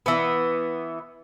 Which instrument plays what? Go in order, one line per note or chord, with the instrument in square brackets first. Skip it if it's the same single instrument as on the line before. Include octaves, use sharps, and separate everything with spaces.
[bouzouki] E3 B3